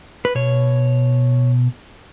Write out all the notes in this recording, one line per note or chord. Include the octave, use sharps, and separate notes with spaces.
B4
B2 C#5